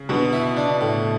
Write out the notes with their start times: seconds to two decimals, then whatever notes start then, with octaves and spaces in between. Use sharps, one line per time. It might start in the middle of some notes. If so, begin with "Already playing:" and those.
Already playing: C#3
0.09 B2 D3 B3
0.33 E4
0.57 D4
0.81 A2